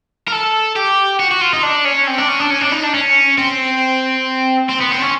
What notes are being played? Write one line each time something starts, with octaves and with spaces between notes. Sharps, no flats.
A#4
A4
G4
F#4
F#4
F4
D#4
D4
C#4
C4
D4
C#4
D4
C#4
D4
D#4
D4
C#4
C4
C4
B3
C4
C#4